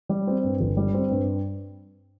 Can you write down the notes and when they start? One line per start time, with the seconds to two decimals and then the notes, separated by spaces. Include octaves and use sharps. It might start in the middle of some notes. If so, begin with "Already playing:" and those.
0.09 G3
0.27 C4
0.44 G2
0.60 G1
0.77 G3
0.94 C4
1.11 G2